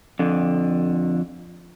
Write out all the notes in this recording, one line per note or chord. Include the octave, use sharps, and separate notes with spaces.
F2 D3